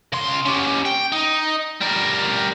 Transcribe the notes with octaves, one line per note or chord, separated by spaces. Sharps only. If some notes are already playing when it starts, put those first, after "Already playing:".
C#3 C6
C#4 G4
G5
D#4
G3 A#4